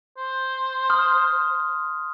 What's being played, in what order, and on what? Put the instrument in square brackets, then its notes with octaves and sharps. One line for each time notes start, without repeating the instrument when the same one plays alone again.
[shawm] C5
[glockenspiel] C6 D#6 F6